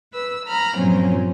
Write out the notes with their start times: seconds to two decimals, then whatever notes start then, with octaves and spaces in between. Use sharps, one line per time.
0.12 B4 E6
0.45 A#5 B5 F6
0.76 G2 A#2 F3 F#3 C4 C#4